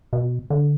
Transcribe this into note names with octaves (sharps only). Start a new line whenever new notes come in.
B2
D3